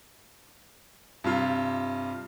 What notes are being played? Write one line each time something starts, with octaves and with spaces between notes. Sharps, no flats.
G2 C3 F4